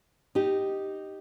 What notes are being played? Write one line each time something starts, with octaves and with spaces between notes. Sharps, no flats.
D#4 G4